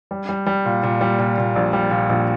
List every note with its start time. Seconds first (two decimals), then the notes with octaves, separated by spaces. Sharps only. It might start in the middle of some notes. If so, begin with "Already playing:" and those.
0.11 G3
0.29 G3
0.46 G3
0.65 A#2
0.83 A#2
1.01 G3
1.19 A#2
1.38 A#2
1.56 A#1
1.73 G3
1.91 A#2
2.10 A#1